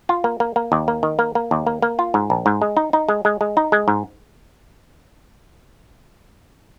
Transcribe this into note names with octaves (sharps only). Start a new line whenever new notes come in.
F4
A#3
A#3
A#3
D#2
A#3
D#3
A#3
A#3
D#2
A#3
A#3
F4
G#2
A#1
G#2
G#3
D#4
D#4
G#3
G#3
G#3
D#4
G#3
G#2